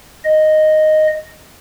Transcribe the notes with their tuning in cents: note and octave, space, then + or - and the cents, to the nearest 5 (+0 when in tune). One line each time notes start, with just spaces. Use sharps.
D#5 -5